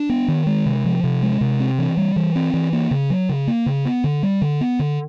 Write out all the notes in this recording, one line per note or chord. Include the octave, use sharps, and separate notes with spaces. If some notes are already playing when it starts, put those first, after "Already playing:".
Already playing: D4
B3
D#3
G#3
C3
F3
C3
G#3
C3
C4
E3
G3
E3
C4
E3
A#3
C#3
F#3
C#3
A#3
C#3
B3
D3
G3
D3
B3
D3